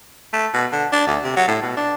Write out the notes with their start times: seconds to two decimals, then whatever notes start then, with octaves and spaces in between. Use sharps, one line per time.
0.33 A3
0.54 B2
0.72 D3
0.92 D4
1.07 D2
1.24 C3
1.36 F#3
1.48 A2
1.62 B2
1.77 D4